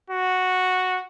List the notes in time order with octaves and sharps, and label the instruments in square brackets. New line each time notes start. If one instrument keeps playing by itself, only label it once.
[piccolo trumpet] F#4